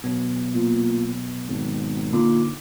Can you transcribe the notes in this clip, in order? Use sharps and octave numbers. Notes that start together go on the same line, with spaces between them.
B2 F#3 B3
A#2
G#1
A#2 D3 D#4 D6